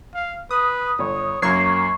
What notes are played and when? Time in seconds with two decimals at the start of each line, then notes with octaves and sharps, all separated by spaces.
0.14 F5
0.51 B4 D#6
0.99 G1 C#5
1.42 F#2 F#3 A#3 C#6 G#6 C7